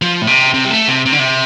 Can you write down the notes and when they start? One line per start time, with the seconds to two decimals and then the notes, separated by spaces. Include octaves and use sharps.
0.02 F3
0.22 A2
0.27 C3
0.54 C3
0.65 G3
0.71 A3
0.88 C3
1.06 C3
1.12 D3
1.19 C3